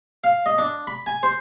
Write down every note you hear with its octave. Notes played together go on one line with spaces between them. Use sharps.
F5
D#5
D4
B5
G#5
C5